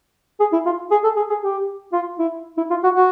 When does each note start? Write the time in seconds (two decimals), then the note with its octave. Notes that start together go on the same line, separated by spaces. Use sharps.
0.40 G#4
0.53 E4
0.66 F4
0.91 G#4
1.04 A4
1.17 G#4
1.30 G#4
1.42 G4
1.93 F4
2.19 E4
2.57 E4
2.70 F4
2.83 F#4
2.96 F#4